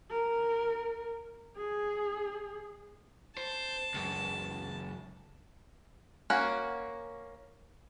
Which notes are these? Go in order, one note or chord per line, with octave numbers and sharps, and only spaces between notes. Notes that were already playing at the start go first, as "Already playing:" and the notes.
A#4
G#4
C5 A5
C#2 F#2
A#3 C#4 F#4